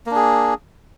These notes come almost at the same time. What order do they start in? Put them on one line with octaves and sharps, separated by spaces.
A#3 D4 G#4